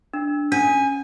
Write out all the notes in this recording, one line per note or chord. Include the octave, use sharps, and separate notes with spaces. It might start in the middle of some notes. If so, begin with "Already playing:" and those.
D4
C#4 G#5